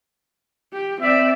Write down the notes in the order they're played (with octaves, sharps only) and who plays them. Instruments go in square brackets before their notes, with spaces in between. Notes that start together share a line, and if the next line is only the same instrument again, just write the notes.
[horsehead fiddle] G4
[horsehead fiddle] C4 D5 [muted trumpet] E5